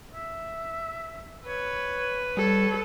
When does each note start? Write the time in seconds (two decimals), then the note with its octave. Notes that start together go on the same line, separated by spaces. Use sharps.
0.14 E5
1.47 B4 C#5
2.37 G3 A4 C#5